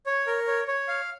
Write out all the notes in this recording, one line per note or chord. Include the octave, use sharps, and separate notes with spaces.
C#5
A#4
C#5
C#5
F5